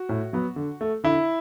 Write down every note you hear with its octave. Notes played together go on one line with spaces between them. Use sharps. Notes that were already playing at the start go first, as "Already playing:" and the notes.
Already playing: F#4
A2
F#3 B3
D3
A3
D3 E4